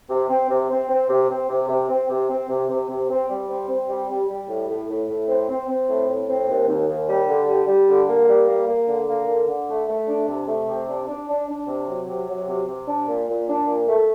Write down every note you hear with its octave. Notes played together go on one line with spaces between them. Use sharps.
C3
C4
C3
C4
C4
C3
C4
C3
C3
C4
C3
C4
C3
C3
C3
C4
G3
C4
C4
G3
G3
G3
A2
A2
A2
A2
C4
C4
C4
A2
A2
C4
D#2
D#2
D#2
G3
D3
G3
G3
D3
A#3
G3
A#3
A#3
D3
A#3
D3
D3
A3
A3
D4
C3
A3
C3
D4
D4
D4
D4
C3
F#3
C3
F#3
C3
C3
D4
A#2
A#2
D4
A#2
A3